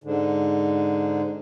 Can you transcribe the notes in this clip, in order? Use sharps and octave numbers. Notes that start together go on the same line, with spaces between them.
G#2 D3